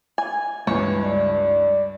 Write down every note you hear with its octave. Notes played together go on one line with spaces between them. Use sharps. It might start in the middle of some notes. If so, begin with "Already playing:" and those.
G#5
C#2 G2 E3 C#5
D5